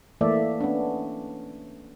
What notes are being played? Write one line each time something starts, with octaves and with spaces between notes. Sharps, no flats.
E3 A3 A#3 D5 E5
B3 C#4 D4